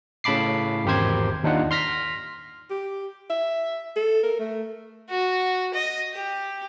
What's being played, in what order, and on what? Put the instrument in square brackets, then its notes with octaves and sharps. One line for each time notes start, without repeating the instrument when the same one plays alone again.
[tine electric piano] A2 C#3 A5 B5 D6 C7
G#1 E2 G4 A#4 C5 G#6
D#2 D4 D#4 F4 F#5
C6 F6 A#6 B6
[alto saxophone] G4
E5
A4
A#4
A3
[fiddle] F#4
D#5
G4